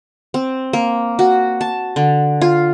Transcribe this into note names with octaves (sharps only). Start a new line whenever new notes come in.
C4
A#3
F#4
A5
D3
F4